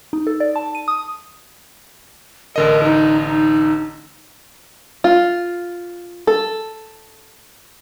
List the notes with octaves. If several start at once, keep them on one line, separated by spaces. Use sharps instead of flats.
D#4
A4
D5
A5
D#7
D#6
A1 D3 A#4 D#5
D#4
D#4
F4
A4